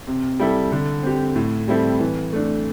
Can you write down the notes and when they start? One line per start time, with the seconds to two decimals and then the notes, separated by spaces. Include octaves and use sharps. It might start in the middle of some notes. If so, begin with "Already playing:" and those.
0.07 C3
0.40 G3 E4 A4
0.72 D3
1.03 C4 G4
1.36 A2
1.68 G3 C4 E4 A4
2.00 E3
2.33 A3 D4